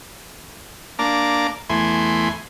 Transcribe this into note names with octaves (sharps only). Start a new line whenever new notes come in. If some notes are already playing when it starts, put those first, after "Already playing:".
A#3 D4 A#5 D6
E2 A3 E4 G#5 C6